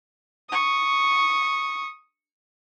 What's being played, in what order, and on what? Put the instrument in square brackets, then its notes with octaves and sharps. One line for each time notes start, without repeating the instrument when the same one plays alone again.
[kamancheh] C#6 D#6